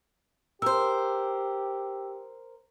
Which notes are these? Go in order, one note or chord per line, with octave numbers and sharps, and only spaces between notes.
G4 A#4 C5 E6